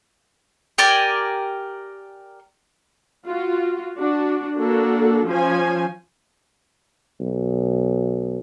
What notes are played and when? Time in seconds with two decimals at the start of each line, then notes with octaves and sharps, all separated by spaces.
0.78 G4 A#4 D5 G#5
3.27 F4 F#4
3.98 D4 F#4
4.57 A#3 D4 F#4 A4
5.27 F3 C#4 C5 G#5
7.20 B1